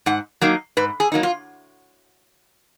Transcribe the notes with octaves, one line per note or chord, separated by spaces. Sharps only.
G#2 F#5
F#3 A#3 D#4
G#2 B4
G#4
F#3 A#3 D#4
F4